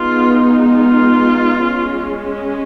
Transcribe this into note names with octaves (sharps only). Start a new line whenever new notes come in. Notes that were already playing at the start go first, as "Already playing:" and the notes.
Already playing: G#3 B3 D#4 F4
F4
G#3 C#4